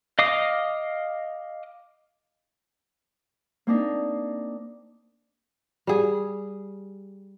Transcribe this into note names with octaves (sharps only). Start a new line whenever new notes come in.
D#5 F5 D6 D#6
A#3 C4 D4 D#4
G3 G#4